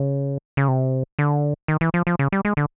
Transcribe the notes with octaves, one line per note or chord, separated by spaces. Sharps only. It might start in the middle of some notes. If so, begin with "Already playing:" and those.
Already playing: C#3
C#3
C3
D3
D#3
E3
F3
F3
C#3
G3
G#3
D3